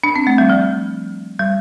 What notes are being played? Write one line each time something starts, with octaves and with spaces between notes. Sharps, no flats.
D4
C4
A3
G3
F3
G3